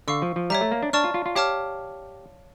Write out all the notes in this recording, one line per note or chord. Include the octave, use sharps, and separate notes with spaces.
D3 F5 C#6 E6
F3
F3
G3 C#5 E5 A#5
A3
A#3
D4
D4 D5 A5 C#6 F6
F4
F4
F4
G4 C#5 F5 A5 D6 F6